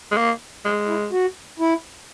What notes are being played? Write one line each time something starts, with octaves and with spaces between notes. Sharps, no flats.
G#3
A#3
G#3
E4
F#4
E4